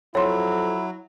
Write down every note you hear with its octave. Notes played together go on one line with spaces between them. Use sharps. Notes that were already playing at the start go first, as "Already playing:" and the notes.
F2 F#3 E4 C#5 C6